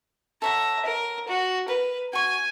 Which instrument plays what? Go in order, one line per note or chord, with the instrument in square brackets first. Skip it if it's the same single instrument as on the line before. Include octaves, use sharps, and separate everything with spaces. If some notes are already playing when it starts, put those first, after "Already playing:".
[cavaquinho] A4 C#5 F#5 [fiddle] E5 A#5
[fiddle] A#4
F#4
[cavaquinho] A#4 [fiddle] B4
[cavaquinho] F#4 C#6 [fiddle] G#5